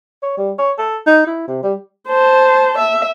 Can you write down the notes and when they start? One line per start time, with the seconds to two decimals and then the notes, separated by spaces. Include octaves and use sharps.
0.22 C#5
0.37 G3
0.58 C#5
0.78 A4
1.07 D#4
1.26 E4
1.48 C3
1.63 G3
2.09 C5 A5
2.78 E5